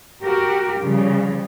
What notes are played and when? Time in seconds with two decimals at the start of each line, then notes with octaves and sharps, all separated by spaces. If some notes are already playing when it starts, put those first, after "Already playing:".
0.21 F#4 G4 A#4
0.81 C#3 F3 G3